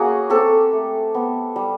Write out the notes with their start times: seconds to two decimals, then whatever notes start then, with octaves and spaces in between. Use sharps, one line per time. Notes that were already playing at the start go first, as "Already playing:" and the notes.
Already playing: A#3 C#4 F#4 G#4
0.30 C4 G4 A4
0.73 A3
1.14 B3
1.56 G3